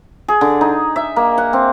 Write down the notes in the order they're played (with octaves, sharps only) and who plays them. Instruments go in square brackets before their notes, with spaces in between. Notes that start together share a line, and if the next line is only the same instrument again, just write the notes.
[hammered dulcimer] G#4
D3
D#4
E5
A#3
F#5
C4